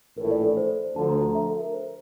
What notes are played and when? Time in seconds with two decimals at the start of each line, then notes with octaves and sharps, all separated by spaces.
0.18 A#1 A2 E3 A3 E4 A#4
0.31 D5
0.44 A4
0.57 C5
0.96 D2 D3 F3 A5
1.09 A#5
1.21 A#5
1.35 E5
1.48 A4
1.61 A#4
1.74 C5